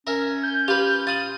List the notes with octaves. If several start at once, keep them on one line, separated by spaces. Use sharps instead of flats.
C#4 A#4 E5
G6
F4 G4 B4
F4 D#6 A6 D#7 F#7